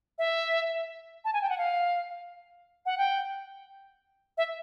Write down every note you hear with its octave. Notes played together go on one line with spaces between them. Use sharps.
E5
A5
G#5
G5
F#5
F5
F#5
G5
E5